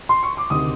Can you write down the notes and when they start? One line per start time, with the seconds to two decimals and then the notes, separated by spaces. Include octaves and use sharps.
0.09 C6
0.23 C#6
0.37 D6
0.50 D2 C3 D#3 D#6